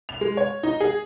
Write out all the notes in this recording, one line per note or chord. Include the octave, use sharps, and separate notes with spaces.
F7
G#3
C#5
D#4
G#4